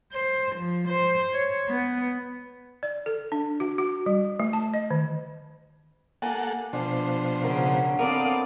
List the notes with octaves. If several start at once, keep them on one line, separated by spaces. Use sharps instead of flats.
C5
F3
C5
C#5
B3
D5
A4
D4
F#4
F#4
G3
A3
A5
D#5
D#3
A#3 G4 A4 F5 F#5 G#5
B2 F3 D4 C5
C#3 F#3 A#4
B3 C4 A4 A#4 D5 F5 D#6